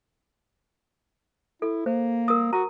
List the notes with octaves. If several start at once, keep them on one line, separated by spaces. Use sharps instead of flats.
E4 A4
A#3 C5
A#4 D#6
F#4 A#5